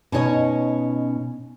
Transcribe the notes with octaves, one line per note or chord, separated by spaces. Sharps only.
B2 C#4 D#4 C#5 D#5